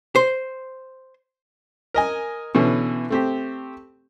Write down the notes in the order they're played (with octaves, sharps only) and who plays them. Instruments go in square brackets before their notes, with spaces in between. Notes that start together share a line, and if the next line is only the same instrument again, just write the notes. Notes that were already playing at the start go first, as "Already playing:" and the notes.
[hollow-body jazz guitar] C5
[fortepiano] A#4 D#5 G#5
B2 D3 E3 C#4
A3 C4 G4